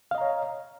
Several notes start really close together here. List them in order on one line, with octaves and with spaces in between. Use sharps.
F5 D#5 A#5 C#5